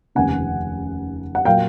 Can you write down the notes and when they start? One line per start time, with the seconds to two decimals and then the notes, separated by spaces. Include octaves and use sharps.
0.15 F1 D#2 C#3 F#5 G#5
1.35 F#5
1.45 A#2 F#3 A#3 F5 G5